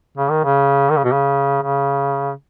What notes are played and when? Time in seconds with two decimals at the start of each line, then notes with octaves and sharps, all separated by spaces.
0.17 C#3
0.30 D#3
0.44 C#3
0.90 D#3
0.97 C#3
1.04 B2
1.12 C#3
1.63 C#3